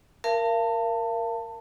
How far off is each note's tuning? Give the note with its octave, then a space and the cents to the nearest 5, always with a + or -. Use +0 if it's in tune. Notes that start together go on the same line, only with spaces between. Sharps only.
A#4 +0 F5 -40 A5 +25